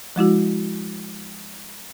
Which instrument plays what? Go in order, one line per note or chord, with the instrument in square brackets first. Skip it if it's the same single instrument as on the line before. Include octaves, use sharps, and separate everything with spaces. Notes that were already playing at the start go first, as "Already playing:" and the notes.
[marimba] F3 G#3 E4 F#4